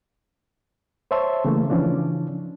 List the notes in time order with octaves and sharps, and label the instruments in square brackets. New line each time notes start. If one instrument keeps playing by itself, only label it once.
[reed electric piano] C5 C#5 E5 A5 C6
C#3 E3 A3 A#3
C#3 E3 F3 C#4 D4